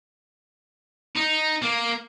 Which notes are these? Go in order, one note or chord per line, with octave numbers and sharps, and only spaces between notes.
D#4
A#3